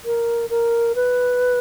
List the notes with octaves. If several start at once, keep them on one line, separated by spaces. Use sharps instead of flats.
A#4
A#4
B4